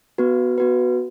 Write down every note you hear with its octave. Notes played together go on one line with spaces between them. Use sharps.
B3 F#4 B4
B3 F#4 B4